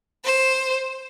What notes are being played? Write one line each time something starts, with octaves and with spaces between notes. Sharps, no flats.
C5